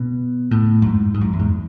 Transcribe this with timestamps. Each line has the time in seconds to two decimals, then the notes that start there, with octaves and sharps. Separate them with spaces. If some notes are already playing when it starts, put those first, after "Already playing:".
Already playing: B2
0.51 A2
0.82 F#2
0.86 G#2
1.14 G#2
1.21 F#2
1.33 E2
1.40 G#2